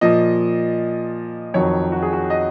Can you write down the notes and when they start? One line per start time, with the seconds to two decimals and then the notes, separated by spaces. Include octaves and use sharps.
0.01 A#2 F3 D#5
1.54 F2 D#3 F#3 C#5
1.92 F#4
2.02 G#4
2.13 F#4
2.30 D#5